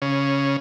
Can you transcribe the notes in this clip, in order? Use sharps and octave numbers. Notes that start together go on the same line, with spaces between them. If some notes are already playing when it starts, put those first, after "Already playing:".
C#3